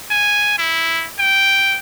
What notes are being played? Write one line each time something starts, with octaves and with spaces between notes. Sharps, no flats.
G#5
E4
G5